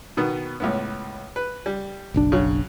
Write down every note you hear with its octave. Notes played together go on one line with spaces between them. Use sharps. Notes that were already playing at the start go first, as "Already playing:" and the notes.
B2 D#3 B3
C#2 A2 B3
B4
G3
F#1 B1 D4
C#3 F#3